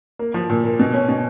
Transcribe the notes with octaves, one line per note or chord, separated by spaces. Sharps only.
A#3
F3
A#2
A#3
B2
C#4
B2